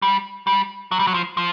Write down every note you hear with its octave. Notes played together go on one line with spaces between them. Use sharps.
G3
G3
F#3
G3
F#3
F3
F3